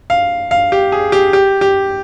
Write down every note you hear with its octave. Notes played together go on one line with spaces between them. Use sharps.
F5
F5
G4
G#4
G4
G4
G4